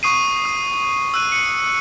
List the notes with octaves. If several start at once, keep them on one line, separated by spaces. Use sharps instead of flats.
C#6 D#6 C7 D#7
D#6
E6 F#6 D#7
C#7